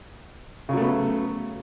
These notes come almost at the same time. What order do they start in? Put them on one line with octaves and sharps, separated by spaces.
C#3 F#3 A3 B3